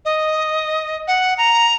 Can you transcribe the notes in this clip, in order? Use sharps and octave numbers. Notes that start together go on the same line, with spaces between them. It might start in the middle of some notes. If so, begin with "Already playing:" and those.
D#5
F#5
A#5